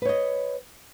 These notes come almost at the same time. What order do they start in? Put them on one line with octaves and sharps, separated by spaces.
B4 C#5 D#5